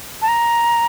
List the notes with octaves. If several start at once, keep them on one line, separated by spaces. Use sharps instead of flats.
A5
A#5